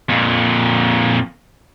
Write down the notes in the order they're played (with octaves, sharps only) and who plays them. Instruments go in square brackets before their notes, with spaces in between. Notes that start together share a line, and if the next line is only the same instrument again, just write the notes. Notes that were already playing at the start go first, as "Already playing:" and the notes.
[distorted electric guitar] F2 A#2